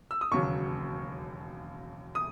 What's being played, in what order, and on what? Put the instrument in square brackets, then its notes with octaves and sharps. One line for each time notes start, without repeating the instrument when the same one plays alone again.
[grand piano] E6
D#6
E1 D#2 C#3 F#3 C#6
D#6